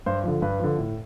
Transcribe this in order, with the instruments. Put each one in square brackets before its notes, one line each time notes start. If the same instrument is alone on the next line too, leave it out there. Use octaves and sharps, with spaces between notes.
[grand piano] G2 C5
D3 F3
G2 B4
D3 F3
A2